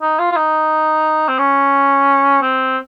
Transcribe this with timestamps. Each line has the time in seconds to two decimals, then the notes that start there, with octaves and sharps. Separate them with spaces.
0.02 D#4
0.19 F4
0.31 F4
0.36 D#4
1.29 C4
1.39 C#4
2.42 C4